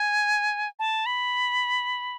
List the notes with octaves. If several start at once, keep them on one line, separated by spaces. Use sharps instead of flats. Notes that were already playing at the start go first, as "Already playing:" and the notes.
Already playing: G#5
A5
B5